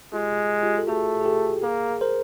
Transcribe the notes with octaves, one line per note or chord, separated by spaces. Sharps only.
G#3 F4 G4
F4 G4
A4
A3 F#4 G#4
G#4
G4 A4
A#3 G#4 A#4
A#4 C5